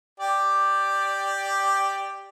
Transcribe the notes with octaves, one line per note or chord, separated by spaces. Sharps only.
G4 D5